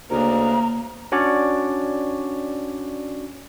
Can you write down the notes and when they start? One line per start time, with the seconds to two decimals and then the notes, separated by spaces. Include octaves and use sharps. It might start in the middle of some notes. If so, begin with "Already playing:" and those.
0.10 D2 C#3 A#3 A#5
1.12 C#4 D4 F#4 C#5 D5